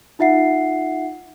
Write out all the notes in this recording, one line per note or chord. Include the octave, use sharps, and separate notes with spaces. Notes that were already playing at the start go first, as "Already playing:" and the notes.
D#4 F4 E5 F#5 C7